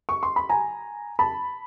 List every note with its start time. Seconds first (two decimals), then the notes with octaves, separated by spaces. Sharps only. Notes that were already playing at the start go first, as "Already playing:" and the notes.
0.09 C#6
0.23 C6
0.36 B5
0.49 G#5 A#5
1.19 A5 B5